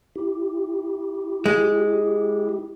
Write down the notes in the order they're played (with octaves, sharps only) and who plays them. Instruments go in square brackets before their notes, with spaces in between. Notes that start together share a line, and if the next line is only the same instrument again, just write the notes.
[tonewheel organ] E4 G4
[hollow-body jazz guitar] G#3